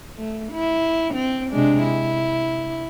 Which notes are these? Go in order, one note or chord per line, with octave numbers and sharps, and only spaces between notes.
A3
E4
C4
C3 G#3 D4
E4